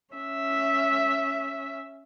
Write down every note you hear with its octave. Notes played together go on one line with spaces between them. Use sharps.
C#4 E5